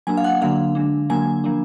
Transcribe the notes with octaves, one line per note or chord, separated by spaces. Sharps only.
F#3 A#3 D4 G#5
F5
F#5
D3 F#3 A#3 D4 F5
D3 G#3 D4
D3 F#3 A#3 D4 G#5
F3 A#3 D4